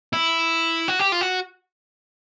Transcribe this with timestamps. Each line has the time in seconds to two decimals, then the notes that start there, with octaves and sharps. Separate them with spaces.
0.13 E4
0.88 F#4
0.99 G4
1.12 F4
1.21 F#4